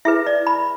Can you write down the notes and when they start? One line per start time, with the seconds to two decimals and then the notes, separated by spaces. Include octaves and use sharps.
0.05 E4 G#4 B4 E5
0.27 D5
0.47 B5